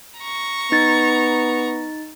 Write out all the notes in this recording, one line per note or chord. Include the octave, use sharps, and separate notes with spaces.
A#5 C#6
B3 D#4 A6